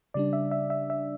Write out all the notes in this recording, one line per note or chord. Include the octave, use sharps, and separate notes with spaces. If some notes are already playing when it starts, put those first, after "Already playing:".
C#3 G3 D4 D5
E5
E5
E5
E5